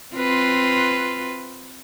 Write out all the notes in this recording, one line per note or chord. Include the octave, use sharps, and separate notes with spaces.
C4 F4 B4